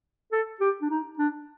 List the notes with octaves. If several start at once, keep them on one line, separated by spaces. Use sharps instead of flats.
A4
G4
D4
D#4
D4